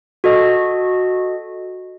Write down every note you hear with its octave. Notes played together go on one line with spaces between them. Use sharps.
F#4 A4 D#5